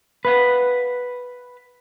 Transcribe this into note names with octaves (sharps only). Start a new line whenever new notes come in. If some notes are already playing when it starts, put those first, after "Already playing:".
B4 F5 F#5